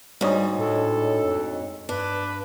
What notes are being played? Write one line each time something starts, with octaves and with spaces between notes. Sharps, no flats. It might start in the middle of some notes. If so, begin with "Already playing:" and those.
D2 G#2 G3 D4 C#5 D#5
A2 A4
F2
G2 D4 B4